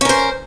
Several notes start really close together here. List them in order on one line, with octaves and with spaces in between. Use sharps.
C#4 A#4 C5